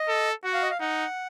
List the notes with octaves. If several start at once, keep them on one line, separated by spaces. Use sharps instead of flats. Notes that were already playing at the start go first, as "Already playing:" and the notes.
Already playing: D#5
A4
F#4 F#5
F5
D#5
F5
D#4 F#5